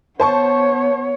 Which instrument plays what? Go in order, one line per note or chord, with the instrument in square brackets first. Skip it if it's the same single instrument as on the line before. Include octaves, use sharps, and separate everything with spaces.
[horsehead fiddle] B3 C#5 [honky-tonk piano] C5 A5 C#6